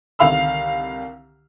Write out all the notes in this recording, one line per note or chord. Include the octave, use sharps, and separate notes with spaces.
C2 D3 D#3 F5 B5 E6